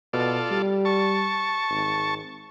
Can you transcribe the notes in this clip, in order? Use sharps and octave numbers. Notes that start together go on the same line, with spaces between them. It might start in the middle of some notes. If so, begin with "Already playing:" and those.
B2 F4 A4 D5
G3
A5 C#6
G#1